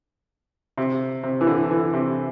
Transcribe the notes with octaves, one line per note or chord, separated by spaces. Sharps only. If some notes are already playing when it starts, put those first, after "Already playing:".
C3
C3
E3
D3
E3
C3